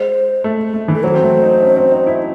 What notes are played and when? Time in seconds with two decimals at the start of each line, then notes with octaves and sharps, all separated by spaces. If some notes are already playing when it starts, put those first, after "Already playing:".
Already playing: G#3 C5
0.44 A3
0.74 A3
0.88 E3
0.94 A4
1.03 F#3 C5
1.14 C4
1.23 A3
1.43 D#4
1.62 C#4
1.77 C4
1.91 D#4
2.07 E4